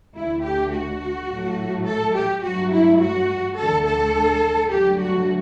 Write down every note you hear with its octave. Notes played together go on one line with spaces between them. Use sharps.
D2 D3 A3 E4
G4
F#4
A2 F#3 A3
A4
G4
G2 F#3 A3 F#4
E4
F#4
D2 D3 A3 A4
A4
G2 D3 F#3 A3 G4
F#4